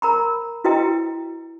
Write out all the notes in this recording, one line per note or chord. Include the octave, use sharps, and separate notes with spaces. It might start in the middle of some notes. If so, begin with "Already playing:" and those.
A#4 A#5 B5
E4 F#4 B4 D#5 G5 A#5